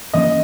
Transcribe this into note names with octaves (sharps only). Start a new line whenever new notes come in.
E3 A#3 C#4 D#5